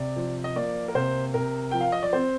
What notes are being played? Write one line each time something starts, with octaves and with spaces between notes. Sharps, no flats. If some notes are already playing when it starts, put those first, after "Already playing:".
Already playing: C3 D5
F3
D#5
A#3 D5
A#4
C3 C5
C3 A#4
F3 G5
F5
D#5
D5
C4 C5